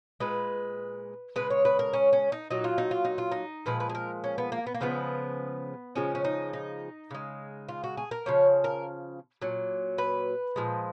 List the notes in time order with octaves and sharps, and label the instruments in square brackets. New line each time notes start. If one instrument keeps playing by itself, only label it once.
[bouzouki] A#2 G#3 B4
C#3 G#3 B4
C#5
B4
A#4
C#4
C#4
D#4
A#2 F#3 D#4
F4
D#4
F4
D#4
F4
D#4
A#2 F3 G#3 B4
B4
G#4
A#4
C#4
B3
A#3
B3
A#3
C#3 F3 G#3 B3
C#3 F3 G#3 C#4
C#4
D#4
D#4
C#3 G#3
F4
F#4
G#4
A#4
C#3 F3 C#5
A#4
A#2 F#3
B4
A#2 F3 G#3